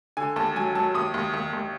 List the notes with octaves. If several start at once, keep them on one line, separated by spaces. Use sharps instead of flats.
D3 G#5
D#2 A5
F#3 G#5
F#3 A5
D#2 D#6
D#2
D#2
D#2